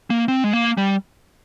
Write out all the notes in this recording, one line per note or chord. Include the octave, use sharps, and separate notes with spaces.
A#3
C4
G#3
A#3
G3